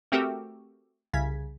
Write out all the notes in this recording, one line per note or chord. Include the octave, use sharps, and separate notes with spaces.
A3 C4 F#4 G4 A4 A#4
C2 C#3 G#6 B6